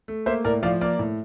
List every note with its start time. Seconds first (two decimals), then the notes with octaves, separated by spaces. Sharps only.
0.08 A3
0.26 A#3 C5 E5
0.45 A2 A#4 D5
0.63 F3 D5 F5
0.81 A#3 A#4 D5
0.99 A2